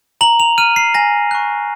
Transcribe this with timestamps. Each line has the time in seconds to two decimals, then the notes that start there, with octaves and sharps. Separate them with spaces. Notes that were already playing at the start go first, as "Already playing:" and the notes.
0.21 A#5 F#7
0.40 F7
0.58 F6 D#7
0.76 C7
0.94 G#5 A#6
1.31 C#6 F#6